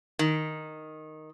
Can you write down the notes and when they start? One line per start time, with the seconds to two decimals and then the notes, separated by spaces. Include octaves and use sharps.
0.19 D#3